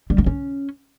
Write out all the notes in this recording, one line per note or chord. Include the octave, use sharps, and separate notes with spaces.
G3
A#3
C#4